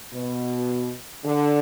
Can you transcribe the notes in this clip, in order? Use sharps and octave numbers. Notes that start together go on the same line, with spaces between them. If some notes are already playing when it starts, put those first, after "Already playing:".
B2
D3